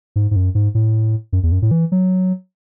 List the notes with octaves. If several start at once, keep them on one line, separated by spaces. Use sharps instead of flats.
G#2
G#2
F#2
G#2
A2
F#2
E2
F#2
A2
E3
F#3